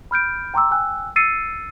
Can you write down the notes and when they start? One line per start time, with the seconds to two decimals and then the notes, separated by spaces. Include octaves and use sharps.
0.11 B5 F6 G6 D7
0.54 G5 A#5 C6 D6 E6
0.71 G5 G#5 E6 F#6
1.16 E6 A6 C7 C#7 D#7